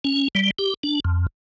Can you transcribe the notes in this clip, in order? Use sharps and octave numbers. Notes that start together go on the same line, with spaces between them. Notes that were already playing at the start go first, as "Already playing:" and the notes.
C#4
G3
G4
D4
F2